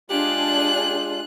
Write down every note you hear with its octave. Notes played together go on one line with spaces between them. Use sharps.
G#3 D4 F4 G4 G#4 F#6